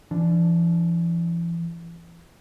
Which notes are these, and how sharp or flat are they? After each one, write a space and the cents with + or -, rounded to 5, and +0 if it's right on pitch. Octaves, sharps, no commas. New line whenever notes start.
E3 +45 D4 +0